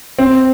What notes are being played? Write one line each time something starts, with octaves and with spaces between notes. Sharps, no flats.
C4